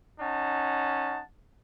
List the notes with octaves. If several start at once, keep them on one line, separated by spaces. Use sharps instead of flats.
C#4 D#4 F#5 A5